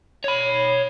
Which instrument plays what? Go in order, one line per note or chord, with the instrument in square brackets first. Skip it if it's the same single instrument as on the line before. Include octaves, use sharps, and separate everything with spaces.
[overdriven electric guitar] C#5 B5